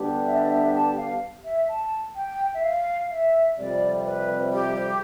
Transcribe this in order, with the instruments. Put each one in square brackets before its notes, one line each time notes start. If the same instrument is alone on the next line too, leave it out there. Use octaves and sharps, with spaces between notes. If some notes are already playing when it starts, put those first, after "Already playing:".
Already playing: [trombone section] D3 G3 B3 D4 G4
[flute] E5
D5
E5
A5
F5
E5
A5
G5
E5
F5
E5
[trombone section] F2 C3 G3 [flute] D5
[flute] B4
G4